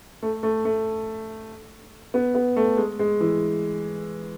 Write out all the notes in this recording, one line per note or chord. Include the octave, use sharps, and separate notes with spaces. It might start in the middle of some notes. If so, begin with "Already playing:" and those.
A3
A3
A3
B3
B3
A3
G#3
G#3
E3